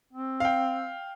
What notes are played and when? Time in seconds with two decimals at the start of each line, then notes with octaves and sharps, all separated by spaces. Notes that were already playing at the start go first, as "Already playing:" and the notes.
0.13 C4
0.40 F5 G5